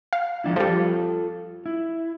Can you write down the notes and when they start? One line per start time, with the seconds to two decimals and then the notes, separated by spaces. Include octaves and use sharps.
0.13 F5
0.44 F3 D4 E4
0.56 F3 G3 F4 A4
1.66 E4